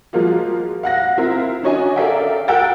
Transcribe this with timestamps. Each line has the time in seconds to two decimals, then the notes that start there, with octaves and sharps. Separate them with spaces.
0.13 F3 G#3 A#3 F4 F#4
0.83 F5 F#5 A#6
1.18 C4 E4 F4 A#4
1.63 C#4 D4 F#4 C#5 D#5 G#5
1.96 A4 A#4 D5 E5 F5 G5
2.48 A#4 F#5 G5 E6 A6